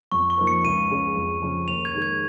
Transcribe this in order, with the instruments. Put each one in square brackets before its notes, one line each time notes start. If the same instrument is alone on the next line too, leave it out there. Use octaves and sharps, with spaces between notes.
[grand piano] F2 [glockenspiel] C#6
[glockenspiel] C#6
[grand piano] F3 A#3 D#4 A#4
[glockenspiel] C#7
[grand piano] C#2 [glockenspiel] D#7
[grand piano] C#3 G#3 C#4 G#4
F2
C#3 F3 C#4 G#4
[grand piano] D#2 [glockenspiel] F7
[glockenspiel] G#6
[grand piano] D#3 G#3
[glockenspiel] G#6